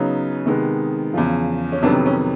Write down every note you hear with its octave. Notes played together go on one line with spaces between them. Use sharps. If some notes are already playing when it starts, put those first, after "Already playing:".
Already playing: C#3 F#3 B3 D#4
C3 D#3 G#3 B3
E2 C#3 F3
C#4
F2 C3 D#3 F#3 B3 D4
C#4